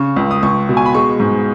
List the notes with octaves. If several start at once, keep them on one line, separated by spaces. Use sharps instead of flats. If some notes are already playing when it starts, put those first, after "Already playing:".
Already playing: C#3 C#6
C#2
D#6
C#2 C#6
B2
G#5
B5
G#3 C#6
G#2